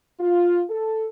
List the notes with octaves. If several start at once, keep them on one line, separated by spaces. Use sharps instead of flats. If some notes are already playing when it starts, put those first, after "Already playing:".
F4
A4